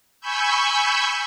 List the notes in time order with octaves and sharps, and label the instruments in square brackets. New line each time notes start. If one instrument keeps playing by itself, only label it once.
[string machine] G#5 B5 C#6 E6 G6